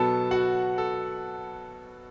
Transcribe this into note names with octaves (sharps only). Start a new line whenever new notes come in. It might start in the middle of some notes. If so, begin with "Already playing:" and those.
Already playing: B2 F#3 B3 A4 A5
F#4 F#5
A4